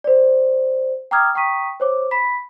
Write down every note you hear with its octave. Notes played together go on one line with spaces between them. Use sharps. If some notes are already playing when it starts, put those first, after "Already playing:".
C5 D5
G5 A#5 D6 D#6 F6 G#6
G5 A#5 C#6 D#6 B6 D#7
C5 C#5 D6
B5 B6